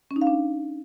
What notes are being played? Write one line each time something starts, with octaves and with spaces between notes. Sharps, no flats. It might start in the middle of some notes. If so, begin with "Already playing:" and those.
C#4
D#4
F5
D4